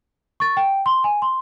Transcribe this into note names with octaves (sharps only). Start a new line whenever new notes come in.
C#6 A6
G5
C6
G#5
C6